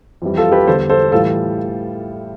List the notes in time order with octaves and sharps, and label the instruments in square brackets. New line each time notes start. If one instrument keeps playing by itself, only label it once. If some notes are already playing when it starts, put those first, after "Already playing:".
[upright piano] F2 E3 G3
F4 A4
G4 B4
E2 D3 G3 A4 C5
A4 C5
A2 E3 G3 F4 A4